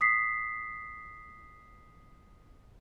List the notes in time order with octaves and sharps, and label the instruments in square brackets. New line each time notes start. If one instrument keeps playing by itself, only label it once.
[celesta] D#6 B6 C7